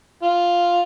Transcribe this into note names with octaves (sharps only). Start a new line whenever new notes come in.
F4